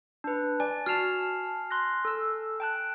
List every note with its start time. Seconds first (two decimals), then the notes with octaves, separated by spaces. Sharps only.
0.24 D4 B4
0.60 D5 G#5
0.86 F#4 A5 F6 C7 F7
1.71 C6 F#6 A#6
2.05 A4 E6
2.60 G5 A5 F#6